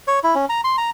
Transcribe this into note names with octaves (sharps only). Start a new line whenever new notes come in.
C#5
E4
C#4
A#5
C6
A#5